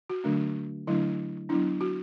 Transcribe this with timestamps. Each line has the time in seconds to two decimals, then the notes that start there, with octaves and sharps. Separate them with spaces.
0.10 F#4
0.24 D3 F#3 A3 D4
0.87 D3 F#3 A3 D4 E4
1.49 F#3 B3 D4 E4
1.81 F#4